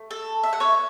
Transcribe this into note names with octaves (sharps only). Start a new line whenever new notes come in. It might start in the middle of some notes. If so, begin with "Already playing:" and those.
Already playing: A3
A4
E5
F#5
C#5 E5